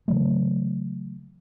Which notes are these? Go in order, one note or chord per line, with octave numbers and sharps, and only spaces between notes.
C#3 E3 F#3 A3